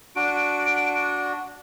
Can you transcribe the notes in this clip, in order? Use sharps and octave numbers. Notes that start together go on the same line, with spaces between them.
D4 F#4 D7